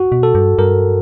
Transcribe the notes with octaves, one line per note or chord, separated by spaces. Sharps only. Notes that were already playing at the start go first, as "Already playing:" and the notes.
Already playing: F#4
B2
A4
G2
G2 A#4